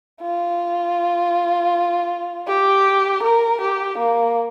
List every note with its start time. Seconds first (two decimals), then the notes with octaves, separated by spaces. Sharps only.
0.22 F4
2.47 G4
3.23 A#4
3.61 G4
3.98 A#3